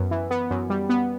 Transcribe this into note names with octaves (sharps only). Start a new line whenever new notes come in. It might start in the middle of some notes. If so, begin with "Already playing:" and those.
Already playing: F#2 B3
E3
B3
F#2
G3
B3